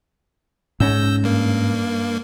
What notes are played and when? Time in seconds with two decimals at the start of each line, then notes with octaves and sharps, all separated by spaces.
0.80 G#2 C#4 E6 G6 A#6
1.23 G2 A#3